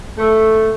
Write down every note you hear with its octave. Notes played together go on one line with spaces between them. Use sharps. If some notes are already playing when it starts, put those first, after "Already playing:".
A3